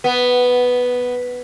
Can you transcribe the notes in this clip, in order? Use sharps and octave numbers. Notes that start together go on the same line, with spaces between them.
B3